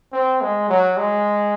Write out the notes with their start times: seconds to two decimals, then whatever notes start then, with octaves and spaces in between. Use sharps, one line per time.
0.13 C4
0.41 G#3
0.69 F#3
0.97 G#3